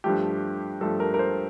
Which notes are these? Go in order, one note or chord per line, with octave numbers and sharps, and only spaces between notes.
G2 F3 A3 G4
G2 F3 A3 A4
A#4
A#4
C5